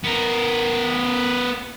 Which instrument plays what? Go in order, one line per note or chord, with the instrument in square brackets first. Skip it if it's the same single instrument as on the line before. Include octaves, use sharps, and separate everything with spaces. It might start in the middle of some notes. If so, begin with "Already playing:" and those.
[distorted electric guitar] B3 A#4